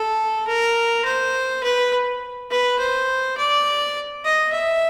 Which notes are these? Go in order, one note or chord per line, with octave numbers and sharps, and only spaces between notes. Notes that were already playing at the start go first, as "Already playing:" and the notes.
Already playing: A4
A#4
C5
B4
B4
C5
D5
D#5
E5